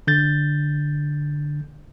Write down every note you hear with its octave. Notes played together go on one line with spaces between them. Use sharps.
D3 G6 A6